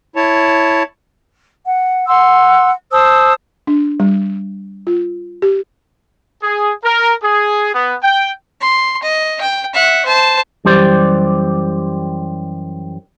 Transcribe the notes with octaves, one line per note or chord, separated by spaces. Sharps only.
E4 C#5 A5
F#5
F#5 C6 E6
C5 A5 D#6 E6
D4
G3
F4
G4
G#4
A#4
G#4
B3
G5
C6
D#5
G5
E5 F#5
C5 A5
F#2 E3 G3 G4 C5 D5